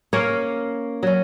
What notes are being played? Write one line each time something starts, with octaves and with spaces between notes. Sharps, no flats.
A#3 C#4 C#5 F5
F#3 C#4